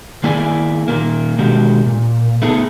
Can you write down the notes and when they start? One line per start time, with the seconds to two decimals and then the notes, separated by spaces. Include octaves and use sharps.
0.24 D#3 A#3 E4 G#4 D5 G#5
0.88 A#2 D#3 A#3
1.39 B2 D3 D#3 G#3 F#4 G4
1.86 A#2
2.42 A3 B3 D#4 G#4 A4